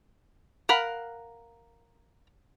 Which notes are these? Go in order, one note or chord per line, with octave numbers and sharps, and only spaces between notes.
A#4 F5 F#5 B5